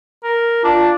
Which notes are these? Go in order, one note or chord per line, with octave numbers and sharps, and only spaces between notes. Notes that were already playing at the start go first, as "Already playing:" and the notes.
A#4
D4 F4 A5